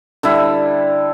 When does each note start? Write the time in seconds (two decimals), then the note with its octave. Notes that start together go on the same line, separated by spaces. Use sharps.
0.23 D3 G3 E4